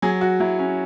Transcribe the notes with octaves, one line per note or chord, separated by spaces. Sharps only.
F#3 G#4
F#4
F#3 E4
C#4